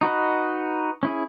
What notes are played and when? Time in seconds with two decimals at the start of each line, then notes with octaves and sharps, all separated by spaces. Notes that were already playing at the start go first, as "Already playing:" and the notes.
0.01 D#4 F#4 B4 D#5
1.03 C#4 E4 G#4